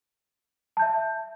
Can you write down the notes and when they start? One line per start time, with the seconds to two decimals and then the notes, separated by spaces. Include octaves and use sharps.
0.77 A5
0.79 G6
0.82 E5